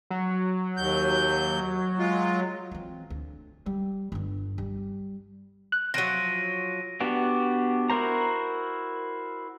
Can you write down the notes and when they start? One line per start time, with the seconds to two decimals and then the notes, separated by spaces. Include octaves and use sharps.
0.11 F#3
0.77 D#2 G6
1.99 G#3 F4
2.71 E3 C4
3.10 D2
3.66 G3
4.12 G1 D3
4.58 G3
5.72 F#6
5.94 F3 F#3 A#6 D7 D#7
7.00 B3 D4 F#4 G4
7.90 E4 F#4 A#4 C5 A#5